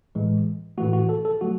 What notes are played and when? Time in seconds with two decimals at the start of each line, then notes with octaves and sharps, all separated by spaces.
0.15 A2 E3 G#3
0.78 A2 E3 A3 F#4
0.93 F#4
1.09 A4
1.25 A4
1.41 F#3 A3 F#4